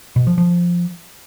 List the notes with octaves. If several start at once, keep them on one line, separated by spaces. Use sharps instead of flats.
B2
F3
F3